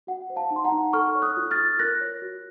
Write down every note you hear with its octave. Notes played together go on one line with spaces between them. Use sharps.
F#4 F#5
C5
F5 A5
D#4
C6
F#5 A#5
D#4
A4 C#6 F6
C#5
D#6 F#6
F4
F6 A6
F4
A#4 F#6 A#6
C#5
F#4